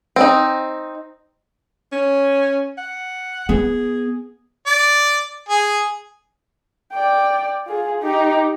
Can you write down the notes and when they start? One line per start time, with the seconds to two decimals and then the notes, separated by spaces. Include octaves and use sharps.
0.16 C4 D#4
1.92 C#4
2.78 F#5
3.49 B3 G#4
4.67 D5
5.49 G#4
6.93 D5 G5
7.67 F4 G#4
8.01 D#4 G4